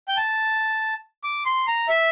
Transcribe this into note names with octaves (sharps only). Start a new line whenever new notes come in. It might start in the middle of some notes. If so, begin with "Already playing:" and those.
G5
A5
D6
C6
A#5
E5